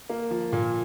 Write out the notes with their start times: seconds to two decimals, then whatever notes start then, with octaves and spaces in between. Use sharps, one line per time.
0.10 A#3
0.31 F3
0.53 A#2